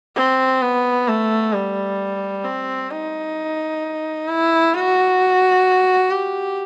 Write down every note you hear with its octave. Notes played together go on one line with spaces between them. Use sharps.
C4
B3
A3
G3
C4
D#4
E4
F#4
G4